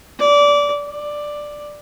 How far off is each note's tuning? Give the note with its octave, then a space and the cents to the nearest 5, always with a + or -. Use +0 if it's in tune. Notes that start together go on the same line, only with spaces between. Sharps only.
D5 -20
D5 +5